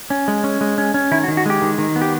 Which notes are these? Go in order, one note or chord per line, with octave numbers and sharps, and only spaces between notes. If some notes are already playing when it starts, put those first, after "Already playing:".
C#4
G#3
C#4
G#3
C#4
C#4
D#3 E4
F#4
D#3
F#4
G#3 G4
D#3
D#3
B3
G4